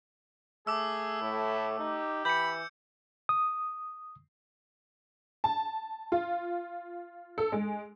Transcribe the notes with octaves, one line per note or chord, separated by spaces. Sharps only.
A3 G#4 D6 E6
A2 E4
D#4 G4
E3 B5 G6 C#7
D#6
A5
F4
A4
G#3